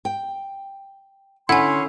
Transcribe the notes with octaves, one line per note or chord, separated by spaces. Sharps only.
G5
D3 C#4 E4 F#5 G#5 C6